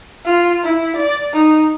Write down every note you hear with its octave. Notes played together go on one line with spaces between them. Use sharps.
F4
E4
D5
D#4